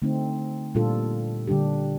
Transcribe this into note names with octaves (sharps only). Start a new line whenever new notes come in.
D3 A3 C4 D#4
A#2 G3 D4 F4 A4
D3 G3 D4 G4